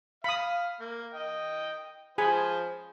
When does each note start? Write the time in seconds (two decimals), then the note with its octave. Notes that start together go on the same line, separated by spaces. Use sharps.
0.24 F5 B5 D#6
0.80 A#3
1.14 D#5 G5
2.18 F3 G#4 C5 G#5 B5